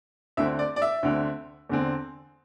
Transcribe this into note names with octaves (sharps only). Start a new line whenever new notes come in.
D2 D3 C4 E5
D5
D5
E5
D2 D3 C4
E2 D3 C4